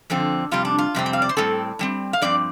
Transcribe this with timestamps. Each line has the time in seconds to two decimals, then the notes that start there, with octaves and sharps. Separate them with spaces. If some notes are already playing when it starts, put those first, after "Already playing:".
0.10 F2 D3 F3 C4
0.51 F2 C3 G3 F4
0.65 D4
0.78 F4
0.95 F2 C3 G3 C4
1.06 G5
1.13 F5
1.22 D5
1.29 C5
1.37 A2 G3 C4 A4
1.79 A2 G3 C4
2.13 F5
2.22 G2 F3 C4 D5